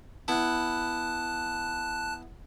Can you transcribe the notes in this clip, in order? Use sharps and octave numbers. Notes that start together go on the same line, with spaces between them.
B3 E4 A5 F#6